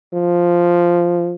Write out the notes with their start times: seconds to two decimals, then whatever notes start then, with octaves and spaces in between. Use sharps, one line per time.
0.13 F3